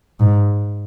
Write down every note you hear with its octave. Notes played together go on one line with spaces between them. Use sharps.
G#2